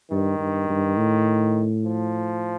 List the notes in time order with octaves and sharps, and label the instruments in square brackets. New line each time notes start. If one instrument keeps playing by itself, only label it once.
[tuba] G2 [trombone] D#3
[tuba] G2
G2
A2
[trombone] F3